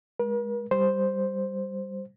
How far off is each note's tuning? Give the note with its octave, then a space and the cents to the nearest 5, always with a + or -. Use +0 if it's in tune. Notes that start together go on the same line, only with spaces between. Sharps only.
G#3 +0 A#4 +45
G3 +0 C5 +0